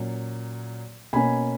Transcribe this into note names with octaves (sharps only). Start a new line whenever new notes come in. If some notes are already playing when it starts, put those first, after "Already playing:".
Already playing: A#2 F#3 C#4
B2 A#3 C#4 G#5 B5